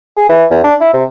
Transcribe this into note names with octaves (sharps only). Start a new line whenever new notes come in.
G#4
E3
E2
D4
E4
C3